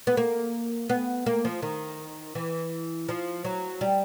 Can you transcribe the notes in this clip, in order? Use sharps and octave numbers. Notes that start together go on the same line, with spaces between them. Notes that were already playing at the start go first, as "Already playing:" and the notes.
B3
A#3
B3
A#3
F3
D#3
E3
F3
F#3
G3